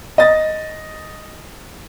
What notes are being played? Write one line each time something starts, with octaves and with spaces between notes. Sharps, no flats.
D#5 A6